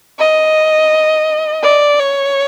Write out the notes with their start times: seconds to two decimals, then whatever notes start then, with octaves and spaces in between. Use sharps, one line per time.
0.19 D#5
1.63 D5
1.99 C#5